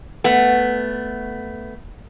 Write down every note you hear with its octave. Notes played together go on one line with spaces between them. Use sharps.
A3 B3